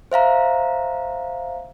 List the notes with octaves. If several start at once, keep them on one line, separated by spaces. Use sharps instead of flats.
C5 E5 F5 A#5